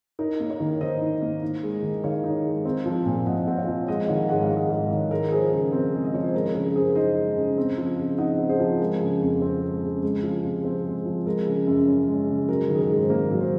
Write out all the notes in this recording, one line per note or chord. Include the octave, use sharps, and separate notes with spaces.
D#4 A#4 C#5
A#3
A#4 C#5
D#3
D#3 C5 D#5
D#4
A#3
D#4
G#3
D#3
D#3 C#5 F5
D#4
G#3
C4
F3
A#2
A#2 D#5 F#5
C4 F#5
C#5 F5
F3
G#3 D#5 F#5
D#3 C#5 F5
G#2 F#5
F5
G#2
D#5
G#3 C#5 F5
D#3
G#3 A#4 C#5
F3 G#4 C5
C#3 A#4
C4
G#3
D#5
F3 C#5
C5
G#3 A#4
G#4
C#3 A#4
A#4
F#2 G#4 C5
D#4 C5 D#5
G#3
C#3
C4
F3
C#3
D#4 D#5 F#5
C4
G#4 C5
F3
G#3 A#4
C#3
F2
C4
G#3
C#3
G#3
F3
C3
C4
G#3
F3
G#3 A#4
C#3
F#2
C#4
G#3
C#3
F#3 A#4
D#3
G#4
A#4
G#2
C5
A#3 A#4
F#3
C#5
G#4 C5